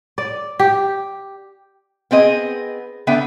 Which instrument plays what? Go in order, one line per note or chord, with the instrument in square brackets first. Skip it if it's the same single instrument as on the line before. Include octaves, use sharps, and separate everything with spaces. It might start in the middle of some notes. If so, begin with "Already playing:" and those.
[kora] D5
G4
[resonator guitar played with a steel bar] B3 C4 G#4 D#5
D3 B3 E5 G5